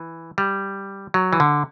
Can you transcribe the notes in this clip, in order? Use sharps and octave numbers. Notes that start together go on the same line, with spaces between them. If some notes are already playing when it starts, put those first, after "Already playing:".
Already playing: E3
G3
F#3
E3
D3